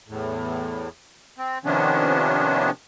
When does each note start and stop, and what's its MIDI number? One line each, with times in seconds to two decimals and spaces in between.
0.08 0.88 40
0.08 0.88 45
1.38 1.58 60
1.65 2.70 48
1.65 2.70 51
1.65 2.70 53
1.65 2.70 59
1.65 2.70 61
1.65 2.70 62